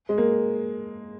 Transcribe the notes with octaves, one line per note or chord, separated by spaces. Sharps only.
G#3
A#3